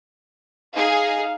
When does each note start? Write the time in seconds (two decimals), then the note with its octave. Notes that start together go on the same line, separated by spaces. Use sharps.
0.75 D#4 G#4 F5